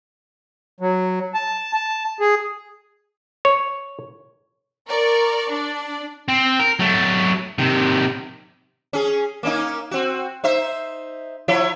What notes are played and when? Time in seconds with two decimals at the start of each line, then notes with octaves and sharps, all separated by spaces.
0.81 F#3
1.34 A5
1.74 A5
2.20 G#4
3.45 C#5
4.88 A#4 D5 C#6
5.50 D4 D5
6.28 C4
6.60 A#4
6.79 F#3 A3
7.58 C3 D#3
8.93 C#4 G#4
9.43 A#3 C#4 D#4
9.91 C4 F#4
10.44 D#4 C5 E5
11.48 F3 E4 C#5